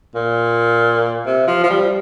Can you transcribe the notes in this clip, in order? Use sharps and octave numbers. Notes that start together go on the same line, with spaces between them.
A#2
C3
F3
F3
G3